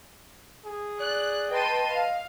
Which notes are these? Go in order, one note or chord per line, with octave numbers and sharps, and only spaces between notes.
G#4
D5 F#6
B4 D#5 G5 A5 C6 D#7
F5